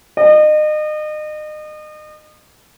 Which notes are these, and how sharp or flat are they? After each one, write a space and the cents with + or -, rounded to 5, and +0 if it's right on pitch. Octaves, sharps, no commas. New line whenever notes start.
D#5 -35